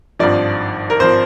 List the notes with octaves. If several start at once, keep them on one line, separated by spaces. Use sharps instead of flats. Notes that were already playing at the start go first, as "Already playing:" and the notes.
G#1 G2 F3 D5
A#4
G#1 F3 C5